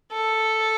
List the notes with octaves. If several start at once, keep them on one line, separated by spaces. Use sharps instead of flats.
A4